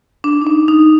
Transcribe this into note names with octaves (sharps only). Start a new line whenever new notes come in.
D4
D#4
D4
D#4